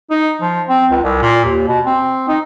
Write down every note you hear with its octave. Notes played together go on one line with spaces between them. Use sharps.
D#4
F3
C4
C#2
C2
A#2
D#2
B2
C4
D#4